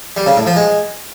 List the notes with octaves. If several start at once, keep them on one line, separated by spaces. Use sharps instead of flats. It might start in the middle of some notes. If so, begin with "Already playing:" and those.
G3
C#3
A2
F3
G#3